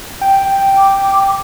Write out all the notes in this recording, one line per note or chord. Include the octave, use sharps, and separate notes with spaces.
G5
D6